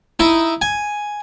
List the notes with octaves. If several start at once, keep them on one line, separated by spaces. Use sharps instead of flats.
D#4 E4
G#5